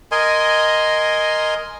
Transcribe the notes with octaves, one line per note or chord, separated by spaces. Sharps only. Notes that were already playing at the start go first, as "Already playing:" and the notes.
A#4 D#5 G#5 C6